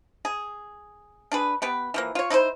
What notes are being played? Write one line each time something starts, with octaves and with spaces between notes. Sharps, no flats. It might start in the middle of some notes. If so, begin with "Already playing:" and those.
G#4
D4 G#4 B4
B3 G4 B4
E3 F3 A#3
F4 C#5
D#4 E4 B4 C5